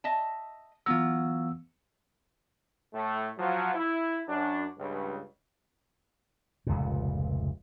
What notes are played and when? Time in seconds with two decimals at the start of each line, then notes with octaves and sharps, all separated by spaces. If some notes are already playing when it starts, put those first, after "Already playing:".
0.04 D#5 E5 A5
0.86 E3 F#3 B3 F4 E6
2.94 A2 A3
3.39 F3 F#3
3.75 E4
4.28 F#2 D4
4.79 C#2 G2
6.67 F1 C#2 A#2